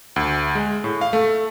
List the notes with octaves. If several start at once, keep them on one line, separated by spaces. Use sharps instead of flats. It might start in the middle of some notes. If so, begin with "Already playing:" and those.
D2
G#3
A2
F5
A3